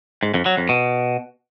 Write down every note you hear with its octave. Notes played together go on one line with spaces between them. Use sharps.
G#2
F2
F#3
F2
B2